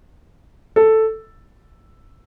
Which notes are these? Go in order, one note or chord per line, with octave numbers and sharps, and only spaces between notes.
A4